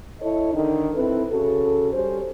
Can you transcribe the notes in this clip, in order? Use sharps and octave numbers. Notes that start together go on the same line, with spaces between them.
E4 A4 C#5 D#5
D3 D#3 D#4
C4 E4 A4 B4
C#3 F#4 A4
G3 C#4 C5